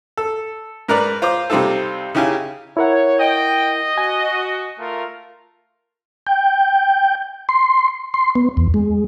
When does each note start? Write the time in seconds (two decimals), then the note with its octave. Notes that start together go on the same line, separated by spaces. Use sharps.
0.17 A4
0.88 G#2 A#4 B4 D5
1.22 F4 C5 A#5 D6
1.50 C3 G3 C4 D#4 F4 A4
2.15 C#3 D#4 E4 G4 F5 G#5
2.77 E4 A#4 C#5 F#5
3.20 D#5 G5
3.98 F#4 G#5
4.79 A3 F4 A#4
6.27 G5
7.49 C6
8.14 C6
8.35 B3
8.57 E2
8.74 G#3